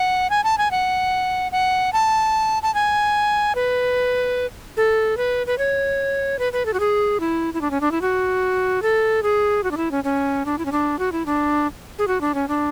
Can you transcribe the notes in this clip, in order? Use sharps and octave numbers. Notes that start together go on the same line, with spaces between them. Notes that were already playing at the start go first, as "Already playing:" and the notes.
Already playing: F#5
G#5
A5
G#5
F#5
F#5
A5
A5
G#5
B4
A4
B4
B4
C#5
B4
B4
A4
F#4
G#4
E4
E4
D4
C#4
D4
E4
F#4
A4
G#4
F#4
D4
E4
C#4
C#4
D4
E4
C#4
D4
F#4
E4
D4
G#4
F#4
D4
C#4
D4